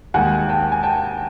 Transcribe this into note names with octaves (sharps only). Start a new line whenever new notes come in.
D#2 D#3 G#3 F#5 G#5
G5 A5
G#5
G5 A5